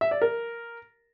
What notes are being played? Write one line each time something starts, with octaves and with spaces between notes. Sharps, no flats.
E5
D5
A#4